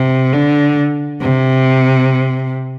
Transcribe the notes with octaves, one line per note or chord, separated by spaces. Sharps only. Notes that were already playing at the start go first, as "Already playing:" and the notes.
Already playing: C3
D3
C3